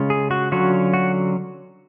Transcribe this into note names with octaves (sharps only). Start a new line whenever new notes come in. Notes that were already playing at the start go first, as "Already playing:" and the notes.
Already playing: C#3 G#3 C#4 F4
G#4
F#4
D3 F#3 C#4 F4 F#4
F#4